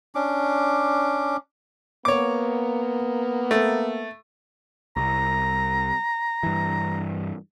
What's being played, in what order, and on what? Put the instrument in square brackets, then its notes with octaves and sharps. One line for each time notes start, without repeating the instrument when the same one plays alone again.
[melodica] C#4 D4 D6
[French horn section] A#3 B3 [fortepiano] C#5 D6
[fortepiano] A3
[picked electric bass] C2 [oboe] A#5
[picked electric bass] G2 E3